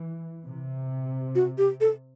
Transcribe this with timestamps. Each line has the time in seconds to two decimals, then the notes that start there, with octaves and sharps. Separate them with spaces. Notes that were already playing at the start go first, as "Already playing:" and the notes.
Already playing: E3
0.46 C3
1.35 F#4
1.58 G4
1.81 A4